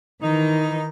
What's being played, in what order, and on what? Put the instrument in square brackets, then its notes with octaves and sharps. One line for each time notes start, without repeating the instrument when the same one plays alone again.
[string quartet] D#3 E3 [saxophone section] D#4